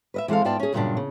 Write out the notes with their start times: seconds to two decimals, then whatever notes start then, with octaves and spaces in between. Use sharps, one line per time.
0.14 B4 D#5 E5
0.28 E3 G#3 C4 A4 F5
0.45 G#2 B3 F4 D5 G5 A5
0.59 C#4 G#4
0.73 E2 G2 A#2 C#3 F#3 D4
0.97 C#3